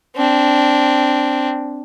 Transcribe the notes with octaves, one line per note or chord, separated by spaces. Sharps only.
C4 D4